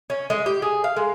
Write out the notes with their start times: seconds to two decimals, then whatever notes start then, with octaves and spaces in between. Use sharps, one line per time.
0.10 C#4
0.30 G#3
0.46 G4
0.62 G#4
0.84 F5
0.96 G#3